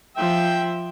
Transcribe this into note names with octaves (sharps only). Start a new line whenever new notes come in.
F3 E5 G5